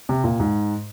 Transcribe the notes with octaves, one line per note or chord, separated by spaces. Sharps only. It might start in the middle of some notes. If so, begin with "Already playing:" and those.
C3
A#2
G#2